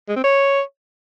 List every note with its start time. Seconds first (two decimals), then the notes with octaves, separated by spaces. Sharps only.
0.09 G#3
0.16 C4
0.24 C#5